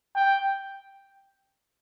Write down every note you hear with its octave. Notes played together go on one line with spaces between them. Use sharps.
G5